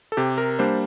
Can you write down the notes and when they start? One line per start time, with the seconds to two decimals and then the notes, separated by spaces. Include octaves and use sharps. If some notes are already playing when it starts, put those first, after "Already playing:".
0.12 A4
0.17 C3 G4
0.38 A#4
0.59 G3 A#3 D4 C5